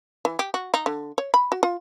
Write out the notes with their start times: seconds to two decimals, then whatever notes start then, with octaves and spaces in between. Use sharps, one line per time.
0.25 E3
0.39 G4
0.54 F#4
0.74 D#4
0.86 D3
1.18 C#5
1.34 B5
1.52 F#4
1.63 F4